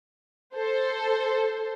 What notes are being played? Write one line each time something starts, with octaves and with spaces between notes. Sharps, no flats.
A4 C5